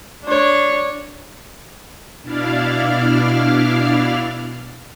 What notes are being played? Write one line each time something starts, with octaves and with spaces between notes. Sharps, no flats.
D4 C#5
B2 D4 E4 D5 F5 F6